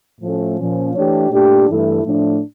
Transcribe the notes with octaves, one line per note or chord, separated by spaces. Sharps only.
A2 F3 A3 C#4
A#2 F3 C#4
E3 A3 D4 G4 C#5
A#2 A3 D4 G4
G2 E3 A3 E4 A4
A2 F3 A3 D4